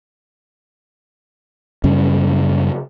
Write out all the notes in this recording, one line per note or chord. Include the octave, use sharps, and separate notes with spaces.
F#2 C#3 G3 C#4